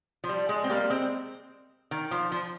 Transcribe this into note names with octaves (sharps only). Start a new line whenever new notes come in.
F3
G3
G#3
C4
G3 A#3
G#3 C4
D#3
F3
F3